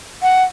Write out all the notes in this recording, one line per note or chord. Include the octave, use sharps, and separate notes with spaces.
F#5